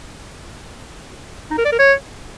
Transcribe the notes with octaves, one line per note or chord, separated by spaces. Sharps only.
D#4
A#4
D5
A#4
C#5